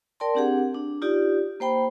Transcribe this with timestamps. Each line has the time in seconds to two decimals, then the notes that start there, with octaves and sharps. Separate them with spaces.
0.20 A#4 D5 G5 A5 C6
0.35 C4 D4 G4 G#4 F#5
0.74 D4
1.02 D#4 F4 G4 D5
1.60 A#3 C5 G5 B5